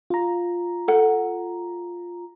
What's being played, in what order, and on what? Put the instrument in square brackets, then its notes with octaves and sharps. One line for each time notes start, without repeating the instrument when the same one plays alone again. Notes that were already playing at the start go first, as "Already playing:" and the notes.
[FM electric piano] F4 A#5
[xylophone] A4 F#5